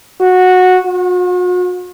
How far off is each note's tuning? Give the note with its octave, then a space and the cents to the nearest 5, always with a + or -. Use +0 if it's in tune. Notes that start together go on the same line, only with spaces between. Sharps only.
F#4 -10
F#4 -45